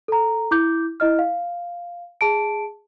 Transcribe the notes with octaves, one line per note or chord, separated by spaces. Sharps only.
A4 A#5
E4 D6 G6
E4 D#5 F6
F5
G#4 A5 D7